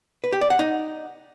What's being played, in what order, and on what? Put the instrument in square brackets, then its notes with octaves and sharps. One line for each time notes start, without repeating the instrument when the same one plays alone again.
[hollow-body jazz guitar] B4
G4
D5
F#5
D#4